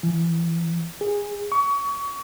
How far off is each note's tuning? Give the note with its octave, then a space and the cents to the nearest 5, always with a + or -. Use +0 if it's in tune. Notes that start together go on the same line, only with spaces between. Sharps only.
E3 +20
G#4 -15
C#6 +30